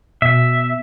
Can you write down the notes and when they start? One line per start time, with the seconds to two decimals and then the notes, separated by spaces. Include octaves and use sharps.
0.22 B2 E5